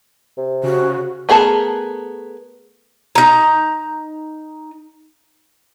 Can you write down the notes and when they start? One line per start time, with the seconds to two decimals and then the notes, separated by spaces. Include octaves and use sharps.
0.37 C3
0.64 C#3 F#4
1.29 A3 B3 G#4 A#4 A5
3.15 D#4 A#5